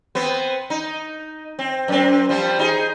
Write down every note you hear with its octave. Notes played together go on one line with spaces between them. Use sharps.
B3 C4
D#4
C4
F#2 C4
F3 G3 C4
D#4 G4 G#4